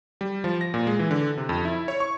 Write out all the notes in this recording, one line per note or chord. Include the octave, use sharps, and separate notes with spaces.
G3
F3
A#6
A#2
G#3
E3
D3
C3
F2
E4
C#5
C#6